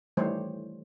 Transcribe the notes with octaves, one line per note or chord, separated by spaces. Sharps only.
D#3 E3 G3 A3 C5 C#5